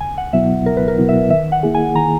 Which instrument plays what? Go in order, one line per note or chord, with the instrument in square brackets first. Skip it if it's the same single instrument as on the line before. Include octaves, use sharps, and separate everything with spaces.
[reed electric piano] C#2 [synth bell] G#5
[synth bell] F#5
[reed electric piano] B2 F#3 B3 E4 [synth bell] E5
[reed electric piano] C#2 [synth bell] A#4
[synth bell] B4
A#4
[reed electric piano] B2 F#3 B3 E4
[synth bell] E5
[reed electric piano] D#3 [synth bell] E5
[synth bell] F#5
[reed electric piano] A#3 E4 G#4
[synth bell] G#5
[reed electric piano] D#3 [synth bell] A#5